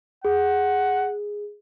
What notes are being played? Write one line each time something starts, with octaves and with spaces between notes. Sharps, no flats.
G#4 F#5